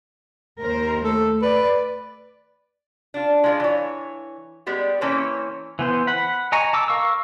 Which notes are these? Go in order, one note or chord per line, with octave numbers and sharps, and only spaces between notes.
D#2 A#4 C5
A3 A4
B4 D5
D4 F4
G#3 F4 D5
E3 C#5
G3 G#3 B3 G4
E3 A#3 C4 C#4 B4 C#5
E3 B3 C5
F#5 B5
D#5 G#5 A#5 C#6
A5 D6 E6
A#4 F5 C#6 E6